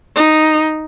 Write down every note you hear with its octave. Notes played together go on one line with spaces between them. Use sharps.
D#4